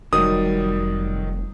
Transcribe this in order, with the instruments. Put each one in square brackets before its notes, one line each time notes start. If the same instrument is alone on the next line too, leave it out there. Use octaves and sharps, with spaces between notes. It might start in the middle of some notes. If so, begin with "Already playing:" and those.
[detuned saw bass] F1 [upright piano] D#3 F#3 [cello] G3 [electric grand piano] D#6